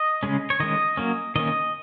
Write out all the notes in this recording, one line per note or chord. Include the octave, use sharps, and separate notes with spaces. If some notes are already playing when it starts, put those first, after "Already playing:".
Already playing: D#5
C#3 G#3 C#4
C#5
D#3 G#3 C#4 D#5
F#3 A#3 C#4
D#3 A#3 C#4 D#5